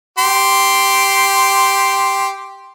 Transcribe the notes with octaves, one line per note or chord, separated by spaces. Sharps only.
G4 C6